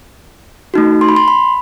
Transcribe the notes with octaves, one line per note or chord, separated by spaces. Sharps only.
A3 D#4 F#4
C6
B5
C6
B5